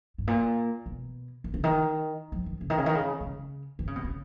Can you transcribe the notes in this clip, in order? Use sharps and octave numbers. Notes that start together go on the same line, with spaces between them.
G#2
A#2
B2
D#3
C#3
D#3
F3
D#3
C#3
D#3
C#3
D#3
C#3
C#3
D#3
C#3
B2
C#3